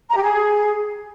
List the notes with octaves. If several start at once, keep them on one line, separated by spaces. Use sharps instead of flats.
A#5
G4
G#4